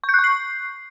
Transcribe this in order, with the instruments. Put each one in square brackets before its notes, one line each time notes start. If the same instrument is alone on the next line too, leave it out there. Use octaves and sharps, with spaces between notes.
[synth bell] C#6
G6
F#6
C#6
C7